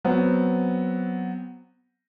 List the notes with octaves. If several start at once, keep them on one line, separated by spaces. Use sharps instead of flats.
F#3 B3 C4